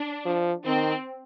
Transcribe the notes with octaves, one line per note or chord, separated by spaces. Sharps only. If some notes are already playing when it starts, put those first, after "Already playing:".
Already playing: D4
F3
D#3 C4